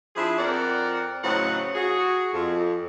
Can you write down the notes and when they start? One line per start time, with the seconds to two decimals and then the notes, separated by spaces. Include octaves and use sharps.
0.16 F3 D4 E4 G#4
0.39 F2 C4 A#4 D5 F#5
1.24 A2 C#3 F#3 C4 D#5 F#5
1.75 F#4 G#4
2.33 F2